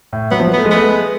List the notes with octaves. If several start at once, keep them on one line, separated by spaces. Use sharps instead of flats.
A2
F#3 B3
F3
F#3
A3 B3
G#3
A3 B3
G#3